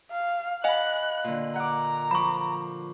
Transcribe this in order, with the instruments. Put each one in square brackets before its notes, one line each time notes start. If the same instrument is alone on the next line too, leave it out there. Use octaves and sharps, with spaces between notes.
[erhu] F5
[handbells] D#5 F5 G#5 [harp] F#5 B5 [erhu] F#6
[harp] A#2 D3
[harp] F#5 D6 [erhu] A#5
[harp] F3 D6 [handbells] B5 C#6